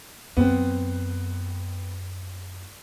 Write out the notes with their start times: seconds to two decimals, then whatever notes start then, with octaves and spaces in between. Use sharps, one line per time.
0.37 F#2 B3 C4